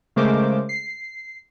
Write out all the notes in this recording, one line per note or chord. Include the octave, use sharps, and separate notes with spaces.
C#3 G#3 A3 A#4 C5 D6
C7